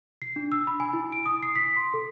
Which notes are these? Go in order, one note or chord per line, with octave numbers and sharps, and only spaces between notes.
C7
D4
E6
B5
G#5
E4
D7
D#6
C7
B6
C6
A4